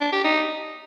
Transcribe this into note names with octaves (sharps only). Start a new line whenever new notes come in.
D4
G4
D#4